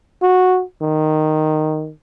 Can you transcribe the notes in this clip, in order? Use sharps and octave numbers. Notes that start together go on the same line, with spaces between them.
F#4
D#3